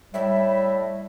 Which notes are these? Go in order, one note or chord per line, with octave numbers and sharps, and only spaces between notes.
A2 G3 E5